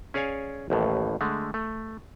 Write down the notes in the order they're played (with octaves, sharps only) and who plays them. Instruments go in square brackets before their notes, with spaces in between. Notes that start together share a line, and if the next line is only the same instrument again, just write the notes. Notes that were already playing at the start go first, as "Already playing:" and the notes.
[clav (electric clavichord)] C#4 G#4 C#5 D5 F5 G#5
A1 D#2 A2
D3 G#3 A3
A3